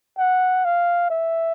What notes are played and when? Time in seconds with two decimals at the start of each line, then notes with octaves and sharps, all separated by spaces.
0.18 F#5
0.65 F5
1.10 E5